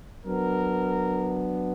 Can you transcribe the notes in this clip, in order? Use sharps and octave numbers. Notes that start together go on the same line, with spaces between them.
F#3 B3 D4 A#4